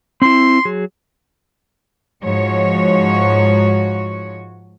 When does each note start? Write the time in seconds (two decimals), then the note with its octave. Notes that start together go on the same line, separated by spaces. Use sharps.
0.22 C4 E4 C6
0.65 F#3 G#4
2.24 G#2 F3 F#4 C#5